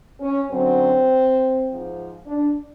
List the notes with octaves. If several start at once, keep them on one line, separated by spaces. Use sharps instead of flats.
C#4
F#2 D3 F#3 C4
G#2 F3
D4